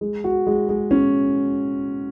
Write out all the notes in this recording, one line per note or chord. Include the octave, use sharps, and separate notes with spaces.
G#3
F#4
G#3
G#3
C#4